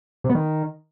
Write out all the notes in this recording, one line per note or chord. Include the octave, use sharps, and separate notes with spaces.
C3
B3
D#3